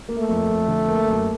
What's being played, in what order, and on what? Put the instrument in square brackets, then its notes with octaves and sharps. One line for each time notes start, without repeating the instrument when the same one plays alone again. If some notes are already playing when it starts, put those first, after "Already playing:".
[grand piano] A#3
[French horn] A3
[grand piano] F2
F2
D3
A#3
F#2